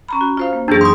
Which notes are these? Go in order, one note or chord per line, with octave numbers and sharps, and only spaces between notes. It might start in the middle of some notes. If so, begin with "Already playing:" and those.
C#4 A#5 B5
F#4
F4 C5 F5
A#3
F#2 E3 F#3 D4 G#4
D#4 C6 D#6